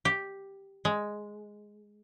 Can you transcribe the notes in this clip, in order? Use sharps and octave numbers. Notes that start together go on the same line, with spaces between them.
G4
G#3